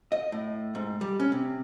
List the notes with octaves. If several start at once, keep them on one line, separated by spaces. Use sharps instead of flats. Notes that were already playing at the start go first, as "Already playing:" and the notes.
D#5
A2
G#2
G3
C#4
C3